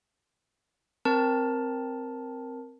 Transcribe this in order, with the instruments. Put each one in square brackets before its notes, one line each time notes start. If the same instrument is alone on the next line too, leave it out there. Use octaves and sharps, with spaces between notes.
[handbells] C4 A#4 A5